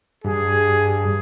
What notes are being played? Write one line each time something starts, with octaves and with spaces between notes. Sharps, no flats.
G2 G#4